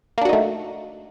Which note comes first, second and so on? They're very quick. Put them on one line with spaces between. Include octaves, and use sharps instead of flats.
A#3 D4 F#4 D#4 A3